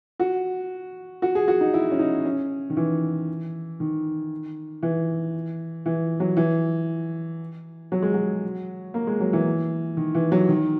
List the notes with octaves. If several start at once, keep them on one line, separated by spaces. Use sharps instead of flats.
F#4
F#4
G#4
F#4
D#4
E4
C#4
D#4
C#4
D#3
E3
D#3
E3
E3
F#3
E3
F#3
G#3
F#3
A#3
G#3
F#3
E3
D#3
E3
F#3
D#3